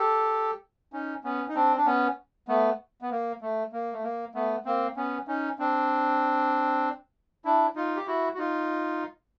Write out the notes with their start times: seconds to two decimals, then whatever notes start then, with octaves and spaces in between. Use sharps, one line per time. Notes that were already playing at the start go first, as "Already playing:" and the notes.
Already playing: G4 A4
0.93 C#4 D#4
1.24 B3 C#4
1.49 D#4
1.55 C4 D4
1.76 D4
1.86 B3 C#4
2.48 A3 B3
3.02 B3
3.11 A#3
3.42 A3
3.72 A#3
3.93 A3
4.03 A#3
4.35 A3 B3
4.65 A#3 C4
4.96 B3 C#4
5.27 C#4 D#4
5.59 C4 D4
7.45 D4 E4
7.76 D#4 F4
7.96 G4
8.07 E4 F#4
8.34 F#4
8.38 D#4 F4